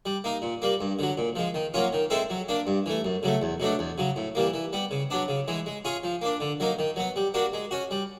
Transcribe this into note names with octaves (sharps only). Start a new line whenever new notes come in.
G3
A#3 D#4
A#2
G3 A#3
G2
D3 F#3
A#2
F3 G#3
D#3
F#3 A#3 C#4 F4
D#3
G#3 C4 E4 A4
F#3
A#3 D4
G2
E3 A3
F#2
C#3 F#3 A3
E2
B2 F#3 A3 D4
E2
C#3 F#3
A2
E3 G3 A#3
E3
G3 B3
C#3
F#3 B3 D4
C#3
E3 G#3
G#3
C#4 F4 G#4
F3
A#3 D4
D3
F#3 A#3 D#4
D#3
F#3 B3
G3
A#3 D4 F#4
G#3
C#4 F#4
G3